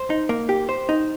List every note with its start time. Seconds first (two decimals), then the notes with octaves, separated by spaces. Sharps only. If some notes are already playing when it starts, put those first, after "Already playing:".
Already playing: C5
0.10 D#4
0.29 A#3
0.49 G4
0.69 C5
0.89 D#4